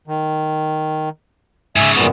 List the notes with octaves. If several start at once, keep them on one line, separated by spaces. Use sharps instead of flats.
D#3
G#2 C#3 E5 G#5
F#2 A#2 B3